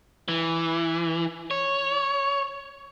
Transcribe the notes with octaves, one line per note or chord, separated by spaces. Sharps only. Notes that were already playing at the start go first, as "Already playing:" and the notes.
E3
C#5